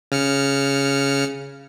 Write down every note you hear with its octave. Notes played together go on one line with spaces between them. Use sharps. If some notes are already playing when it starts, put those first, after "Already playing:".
C#3 F6 C#7